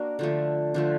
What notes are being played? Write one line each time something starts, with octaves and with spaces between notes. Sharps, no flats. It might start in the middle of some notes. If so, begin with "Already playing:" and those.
Already playing: A#3 D4 F#4 A#4
D3 F3 A3
D3 F3 A3